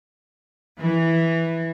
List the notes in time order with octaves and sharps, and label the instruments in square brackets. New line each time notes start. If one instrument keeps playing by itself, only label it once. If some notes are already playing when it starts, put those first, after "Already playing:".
[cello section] E3